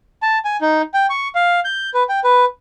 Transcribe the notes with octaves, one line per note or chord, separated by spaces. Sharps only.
A5
G#5
D#4
G5
C#6
F5
G6
B4
G5
B4